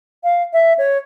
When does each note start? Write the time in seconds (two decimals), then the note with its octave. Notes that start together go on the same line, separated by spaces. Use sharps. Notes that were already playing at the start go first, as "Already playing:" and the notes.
0.24 F5
0.53 E5
0.78 C#5